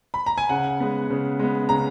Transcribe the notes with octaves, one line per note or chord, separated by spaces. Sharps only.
B5
A#5
G#5
C#3 F#5
G#3 B3
C#3
G#3 B3
C#3 A#5